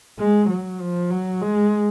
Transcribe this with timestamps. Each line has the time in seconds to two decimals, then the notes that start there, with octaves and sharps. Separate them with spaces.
0.19 G#3
0.50 F#3
0.81 F3
1.11 F#3
1.42 G#3